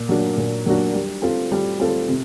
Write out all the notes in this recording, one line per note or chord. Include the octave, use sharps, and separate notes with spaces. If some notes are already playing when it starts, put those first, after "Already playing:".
Already playing: A#2
F#3 A#3 D4 F#4
A#2
F#3 A#3 D4 F#4
G3
C4 F4 A4
G3
C4 F4 A4
C3